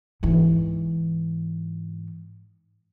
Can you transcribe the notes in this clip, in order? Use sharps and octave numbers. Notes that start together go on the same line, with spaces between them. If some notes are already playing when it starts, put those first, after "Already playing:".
G#2 E3